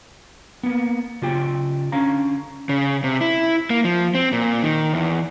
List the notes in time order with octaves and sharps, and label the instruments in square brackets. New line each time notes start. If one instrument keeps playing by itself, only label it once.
[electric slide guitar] A#3 B3
C#3 F4 G4 G5
D3 C#4 F5 A#5
C#3
C3
E4
A#3
F3
C4
A#2
D#3
E2